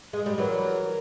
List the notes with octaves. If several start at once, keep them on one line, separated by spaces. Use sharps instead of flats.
G#3
G3
E3 F#3 A#4